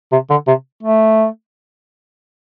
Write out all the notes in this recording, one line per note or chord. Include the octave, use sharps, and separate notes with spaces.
C3
D3
C3
A3